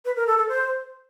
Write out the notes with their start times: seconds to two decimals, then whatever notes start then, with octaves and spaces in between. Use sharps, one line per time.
0.05 B4
0.16 A#4
0.27 A4
0.38 A4
0.49 C5